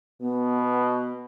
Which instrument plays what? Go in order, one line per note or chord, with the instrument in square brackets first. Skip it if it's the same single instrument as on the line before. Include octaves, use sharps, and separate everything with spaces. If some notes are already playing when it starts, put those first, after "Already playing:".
[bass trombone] B2 [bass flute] B3